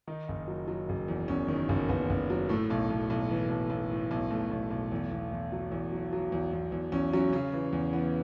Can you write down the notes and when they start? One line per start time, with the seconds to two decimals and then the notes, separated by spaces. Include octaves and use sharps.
0.07 D#3 D#4
0.29 F#1
0.48 F#3
0.68 F#3
0.89 F#1
1.08 E2
1.28 E2 C#4
1.48 D#3
1.69 F#1
1.89 F#1 B3
2.10 F#1
2.30 F#3
2.49 A2 A3
2.70 B1
2.90 B1
3.10 B1
3.31 E3
3.50 B1
3.70 B1
3.91 A2
4.11 B1
4.31 B1 A3
4.51 B1
4.71 B1
4.92 E2
5.11 E2
5.32 E2
5.52 F#3
5.72 E2
5.92 F#3
6.13 F#3
6.32 E2
6.53 E2
6.72 E2
6.92 E2 C#4
7.13 F#3 C#4
7.32 C#3 C#4
7.53 E3
7.73 E2
7.93 E3 B3